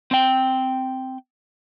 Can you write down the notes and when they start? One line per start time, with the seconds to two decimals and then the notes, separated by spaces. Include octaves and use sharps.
0.11 C4 G5